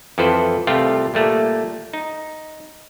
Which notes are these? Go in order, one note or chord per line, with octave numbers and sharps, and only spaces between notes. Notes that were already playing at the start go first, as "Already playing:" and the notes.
F2 E3 F3 A4 B4 C5
C2 A3 C4 F4 G4 F5
A#2 G3 A3 A#3
D#4